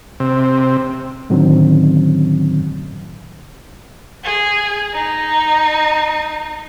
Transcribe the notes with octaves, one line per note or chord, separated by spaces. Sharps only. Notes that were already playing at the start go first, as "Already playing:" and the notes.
C3
A2 D3 D#3 F#3 C4 C#4
G#4
D#4